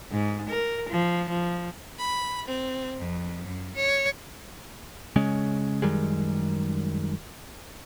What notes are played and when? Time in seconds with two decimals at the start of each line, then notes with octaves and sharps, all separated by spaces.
0.11 G#2
0.50 A#4
0.90 F3
1.29 F3
1.98 B5
2.47 C4
2.98 F2
3.45 F#2
3.75 C#5
5.16 C#3 G#3 C#4
5.82 F#2 D#3 G3 G#3